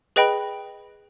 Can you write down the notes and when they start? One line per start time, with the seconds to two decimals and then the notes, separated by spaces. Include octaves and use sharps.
0.16 G#4 B4 D#5 G5 B5